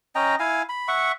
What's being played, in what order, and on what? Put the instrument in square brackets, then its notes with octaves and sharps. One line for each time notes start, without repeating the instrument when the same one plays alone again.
[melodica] C#4 D#5 G5 A#5
E4 F5 G#5
B5
E5 F#5 C#6